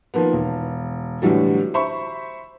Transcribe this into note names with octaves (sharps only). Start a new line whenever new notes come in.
D#3 F3 A#3 B3
E1
A2 D3 E3 F#3 G3
C5 E5 B5 C#6